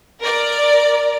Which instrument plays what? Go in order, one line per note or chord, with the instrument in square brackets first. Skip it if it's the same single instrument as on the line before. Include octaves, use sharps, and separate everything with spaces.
[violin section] A#4 D5